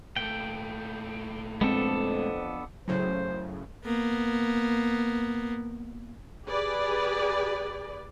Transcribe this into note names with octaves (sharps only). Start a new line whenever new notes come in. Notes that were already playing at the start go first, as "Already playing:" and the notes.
A#2 A3 G5
F2 G#3 B3 C4 D4 A4
F#2 A2 C#3 F#3 C5
A#3 B3
G4 G#4 B4 D5